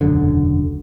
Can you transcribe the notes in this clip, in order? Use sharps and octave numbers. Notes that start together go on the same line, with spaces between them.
E1 C#2 F#2 D3